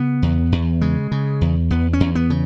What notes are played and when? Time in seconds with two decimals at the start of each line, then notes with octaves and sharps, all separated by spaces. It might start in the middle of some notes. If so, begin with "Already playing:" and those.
Already playing: C#3 B3
0.22 E2
0.52 E2
0.81 C#3 G#3
1.12 C#3
1.41 E2
1.71 E2 B3
1.93 C#4
2.00 E2
2.15 B3
2.30 C#3